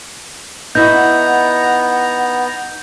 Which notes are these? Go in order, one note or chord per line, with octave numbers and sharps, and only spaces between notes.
B3 D#4 E4 F#4 F#5 A#5 G6